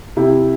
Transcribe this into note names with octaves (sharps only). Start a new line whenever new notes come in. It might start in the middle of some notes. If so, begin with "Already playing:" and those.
C3 E4 G4